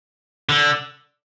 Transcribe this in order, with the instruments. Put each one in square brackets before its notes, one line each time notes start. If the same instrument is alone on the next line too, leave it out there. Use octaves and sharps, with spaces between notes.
[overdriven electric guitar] D3